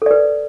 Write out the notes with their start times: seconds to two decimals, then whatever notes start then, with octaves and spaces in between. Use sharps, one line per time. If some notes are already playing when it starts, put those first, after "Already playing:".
0.02 A4
0.06 D5
0.11 B4